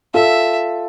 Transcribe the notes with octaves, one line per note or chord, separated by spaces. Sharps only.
F4 A4 E5